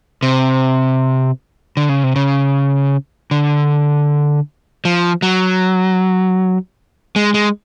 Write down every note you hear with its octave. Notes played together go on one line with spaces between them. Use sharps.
C3
D3
C#3
C3
C#3
D3
F3
F#3
G#3
G#3